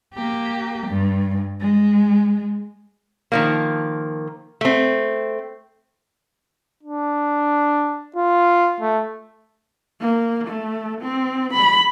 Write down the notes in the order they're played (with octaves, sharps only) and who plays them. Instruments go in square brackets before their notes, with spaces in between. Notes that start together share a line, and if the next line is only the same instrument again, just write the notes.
[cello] A#3 G4
G2
G#3
[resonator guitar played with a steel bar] D#3 F3 A#3
A3 C4
[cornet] D4
F4
A3
[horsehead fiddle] A#3
A3
C4
B5